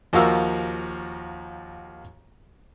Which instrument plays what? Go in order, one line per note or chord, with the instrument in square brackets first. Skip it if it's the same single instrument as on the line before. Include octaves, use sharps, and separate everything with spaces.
[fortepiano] D#2 F3 F#4 A#4 F5 E6